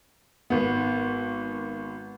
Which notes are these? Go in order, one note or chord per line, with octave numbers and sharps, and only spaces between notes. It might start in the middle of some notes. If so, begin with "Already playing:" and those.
G#1 B3